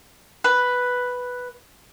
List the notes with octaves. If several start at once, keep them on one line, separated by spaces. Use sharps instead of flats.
B4